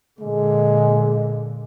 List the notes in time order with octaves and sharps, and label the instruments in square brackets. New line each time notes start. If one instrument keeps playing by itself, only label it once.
[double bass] A#2 D3 [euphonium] G#3